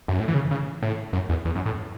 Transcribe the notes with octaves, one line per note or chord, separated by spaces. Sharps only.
F#2
A2
E3
C#3
C#3
A2
F#2
E2
E2
F#2
A2